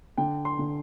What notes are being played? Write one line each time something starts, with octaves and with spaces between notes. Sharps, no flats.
D3 G5
C6
D3